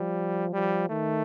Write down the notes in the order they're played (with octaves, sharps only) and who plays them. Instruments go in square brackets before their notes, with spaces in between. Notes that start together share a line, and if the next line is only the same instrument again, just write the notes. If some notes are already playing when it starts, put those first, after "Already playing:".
Already playing: [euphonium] F3 [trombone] G3
[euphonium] F3 [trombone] G3
[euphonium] D#3 [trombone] A3